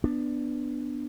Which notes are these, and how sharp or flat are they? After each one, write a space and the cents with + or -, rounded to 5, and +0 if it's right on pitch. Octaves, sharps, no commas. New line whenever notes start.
B3 +0 D4 +10